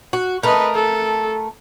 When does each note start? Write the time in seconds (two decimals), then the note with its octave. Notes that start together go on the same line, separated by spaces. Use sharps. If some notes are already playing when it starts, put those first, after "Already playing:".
0.13 F#4
0.43 A3 A#4 B4 D#5
0.75 A4